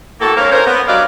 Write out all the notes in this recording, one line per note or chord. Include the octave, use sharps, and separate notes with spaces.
A2 A#3 F#4 A4
G#2 A#3 C#4 A#4 C5 F5
C#4 A#4 C5
B3
F#3 G3 D4 D5 D#5 F5